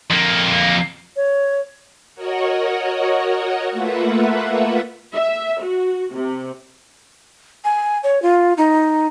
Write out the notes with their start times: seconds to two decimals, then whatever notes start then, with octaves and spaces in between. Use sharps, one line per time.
0.10 F2 A#3
1.16 C#5
2.15 F#4 A#4 C#5 D#5 F#5
3.71 A3 A#3 F4 B4 E5 F#5
5.14 E5
5.62 F#4
6.15 C3
7.64 G#5
8.03 C#5
8.22 F4
8.57 D#4